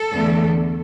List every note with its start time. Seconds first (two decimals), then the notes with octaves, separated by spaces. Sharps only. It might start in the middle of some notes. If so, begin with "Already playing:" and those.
Already playing: A4
0.12 E2 D3 A3